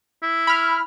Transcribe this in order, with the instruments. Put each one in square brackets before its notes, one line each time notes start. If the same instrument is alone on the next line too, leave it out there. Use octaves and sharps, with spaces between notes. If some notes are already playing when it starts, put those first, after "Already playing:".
[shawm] E4
[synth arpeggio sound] B5 F6